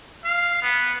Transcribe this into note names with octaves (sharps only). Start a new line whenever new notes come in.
F5
B3